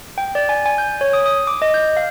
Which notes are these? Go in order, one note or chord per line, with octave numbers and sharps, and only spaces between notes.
G5
D5
G#5
G#5
G6
C#5
D#6
D#6
D6
D#5
G6
F5